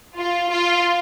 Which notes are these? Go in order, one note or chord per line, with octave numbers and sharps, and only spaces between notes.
F4
F4